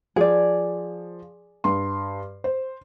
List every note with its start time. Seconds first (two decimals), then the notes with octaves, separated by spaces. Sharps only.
0.16 F3 G#4 D5
1.64 G2 C6
2.44 C5